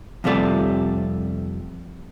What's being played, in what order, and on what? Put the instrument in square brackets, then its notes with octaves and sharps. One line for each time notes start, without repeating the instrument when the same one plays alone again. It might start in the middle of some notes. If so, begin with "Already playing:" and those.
[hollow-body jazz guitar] F2 C3 G3 A3 D5